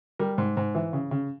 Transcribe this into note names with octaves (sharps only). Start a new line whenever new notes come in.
G3 A#4
G#2
G#2
E3
C#3
C#3